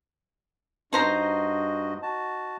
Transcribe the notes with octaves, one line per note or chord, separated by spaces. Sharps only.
G2 D#4 F#4 C5 D#5 A#5
F#4 A5